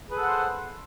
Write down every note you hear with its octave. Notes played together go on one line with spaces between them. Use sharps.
G#4 A4 B4 C5 F#5